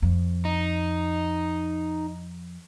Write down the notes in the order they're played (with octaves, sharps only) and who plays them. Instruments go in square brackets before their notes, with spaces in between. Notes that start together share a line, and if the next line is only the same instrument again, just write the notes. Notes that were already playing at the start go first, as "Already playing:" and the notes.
[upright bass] F2
[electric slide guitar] D#4